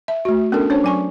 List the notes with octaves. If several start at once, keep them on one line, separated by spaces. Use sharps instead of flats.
E5
A3 F#4
B3 C#4 D4 A4 A#4
C#4 D4 C5 C#5
F#3 G#5 C#6